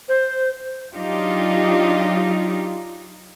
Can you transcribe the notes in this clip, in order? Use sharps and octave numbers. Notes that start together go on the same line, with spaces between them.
C5
F#3 D4 D#4 F4 G4